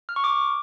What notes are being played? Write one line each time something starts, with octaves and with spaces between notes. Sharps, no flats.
F6
C#6
D6